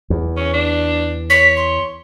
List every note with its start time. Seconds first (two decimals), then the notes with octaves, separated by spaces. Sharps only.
0.10 E2
0.37 C#4
0.53 D4
1.30 C#5 B6
1.56 C6